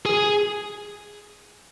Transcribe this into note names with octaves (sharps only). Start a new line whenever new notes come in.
G#4